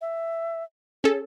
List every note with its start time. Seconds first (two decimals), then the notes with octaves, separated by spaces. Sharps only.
0.01 E5
1.04 C#4 G#4 A4